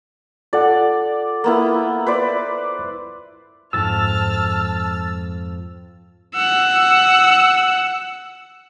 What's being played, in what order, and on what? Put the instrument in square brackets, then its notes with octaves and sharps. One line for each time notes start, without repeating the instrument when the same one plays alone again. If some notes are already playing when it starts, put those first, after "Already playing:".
[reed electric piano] F4 A4 F#5 [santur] D5
[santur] A#3 B3 E4
B4 C5 D5
[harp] F2 G#2 [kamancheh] A5 F6 [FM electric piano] E6 A6
[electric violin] F#5 E6